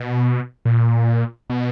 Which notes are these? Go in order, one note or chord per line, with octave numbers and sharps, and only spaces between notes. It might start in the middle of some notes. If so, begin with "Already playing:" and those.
Already playing: B2
A#2
B2